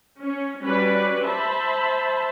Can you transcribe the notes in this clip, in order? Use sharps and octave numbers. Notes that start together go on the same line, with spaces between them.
C#4
G3 C#4 F#4 B4 D5
C5 E5 A5 B5